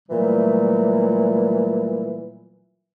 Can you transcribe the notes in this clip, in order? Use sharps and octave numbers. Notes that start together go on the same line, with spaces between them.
A#2 E3 F#3 G3 A3